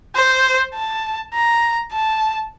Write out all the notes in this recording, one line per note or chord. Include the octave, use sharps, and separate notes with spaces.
C5
A5
A#5
A5